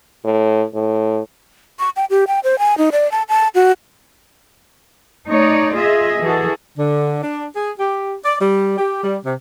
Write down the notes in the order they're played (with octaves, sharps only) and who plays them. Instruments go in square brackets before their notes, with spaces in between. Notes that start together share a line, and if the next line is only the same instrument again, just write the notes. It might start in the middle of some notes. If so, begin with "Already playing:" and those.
[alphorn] A2
A2
[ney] C#6
G5
G4
G5
C5
G#5
D#4
D5
A5
A5
F#4
[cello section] A3 D#4 C#5 D5
F4 G#4 D#5 E5
E3 F#4 G#4 A4
[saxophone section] D3
D4
G#4
G4
D5
G3
G4
G3
C3